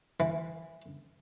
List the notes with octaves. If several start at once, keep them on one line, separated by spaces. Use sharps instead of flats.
E3